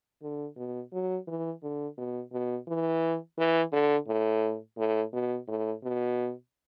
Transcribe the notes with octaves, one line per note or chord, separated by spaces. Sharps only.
D3
B2
F#3
E3
D3
B2
B2
E3
E3
D3
A2
A2
B2
A2
B2